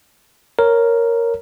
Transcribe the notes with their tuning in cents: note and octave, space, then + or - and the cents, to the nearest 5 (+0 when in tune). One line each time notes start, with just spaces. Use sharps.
A#4 +0 C#5 +0